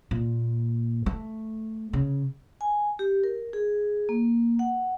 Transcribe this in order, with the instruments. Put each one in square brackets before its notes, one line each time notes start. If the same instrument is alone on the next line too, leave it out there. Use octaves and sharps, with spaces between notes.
[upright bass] A#2
A3
C#3
[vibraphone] G#5
G4
A#4
G#4
A#3
F#5